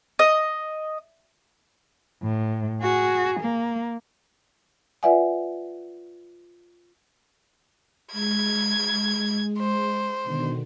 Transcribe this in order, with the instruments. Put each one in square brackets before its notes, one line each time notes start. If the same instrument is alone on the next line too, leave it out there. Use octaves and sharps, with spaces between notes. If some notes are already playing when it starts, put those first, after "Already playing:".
[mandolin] D#5
[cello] A2
F#4 G#4
A#3
[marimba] F4 B4 D5 E5 F#5 G#5
[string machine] G#3 [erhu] G#6
[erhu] C5
[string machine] B2 D3 D#3